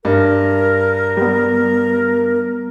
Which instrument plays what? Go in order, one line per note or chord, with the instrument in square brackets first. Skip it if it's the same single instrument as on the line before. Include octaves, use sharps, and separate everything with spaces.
[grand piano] G2 [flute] A#4
[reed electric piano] G3 B3